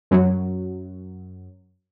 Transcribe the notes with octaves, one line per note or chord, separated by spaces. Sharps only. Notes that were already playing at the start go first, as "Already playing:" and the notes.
F#2 F#3